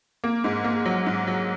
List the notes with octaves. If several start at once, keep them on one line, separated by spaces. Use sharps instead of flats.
A#3
G#2
A#3
F#3
G#2
F#3